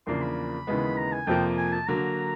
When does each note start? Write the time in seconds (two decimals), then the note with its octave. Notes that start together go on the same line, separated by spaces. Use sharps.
0.07 E2 C#3 F3 A#3 D4 C6
0.22 B5
0.67 D#2 C#3 E3 G#3 B3
0.97 A#5
1.12 G#5
1.27 F2 C3 F3 A#3 G5
1.58 G#5
1.73 A5
1.88 D3 F#3 A#3 A#5